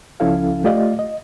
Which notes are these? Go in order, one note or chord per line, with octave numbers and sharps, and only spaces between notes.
C#2 F3 C#4 E4 A4 F5
A3 F4 G4 D5 D#5 F5
D#5